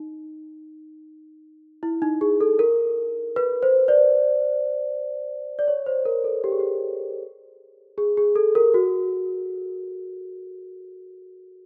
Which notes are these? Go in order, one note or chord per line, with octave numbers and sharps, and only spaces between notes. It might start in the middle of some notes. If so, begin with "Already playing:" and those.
Already playing: D#4
E4
D#4
G#4
A4
A#4
B4
C5
C5 D5
D5
C#5
C5
A#4
A4
G4
G#4
G4
G#4
G#4
A4
A#4
F#4